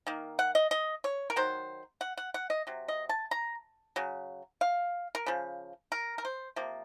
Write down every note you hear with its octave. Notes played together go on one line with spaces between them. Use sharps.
D#3 A#3
F#5
D#5
D#5
C#5
A#4
D#3 F#3 C5
F#5
F#5
F#5
D#5
C3 F#3
D#5
A5
A#5
C#3 F#3
F5
A#4
C#3 F3
A#4
A#4
C5
C3 F3 A#3